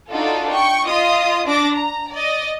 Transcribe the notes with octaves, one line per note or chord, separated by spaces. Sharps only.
D4 D#4 F4 F#4 A4
G5 C#6
F4 D#5 D#6
D4 D6 A#6
A#5
D5 D#5